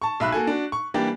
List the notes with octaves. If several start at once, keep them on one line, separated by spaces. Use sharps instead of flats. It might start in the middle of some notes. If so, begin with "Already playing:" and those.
A5 C#6
B1 E5 B5 F#6
A#3 F#4 A4 G#5
D4 F#4
C#6
E3 G3 A#3 D4 G4 D5